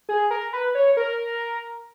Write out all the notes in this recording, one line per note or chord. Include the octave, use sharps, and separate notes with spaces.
G#4
A#4
B4
C#5
A#4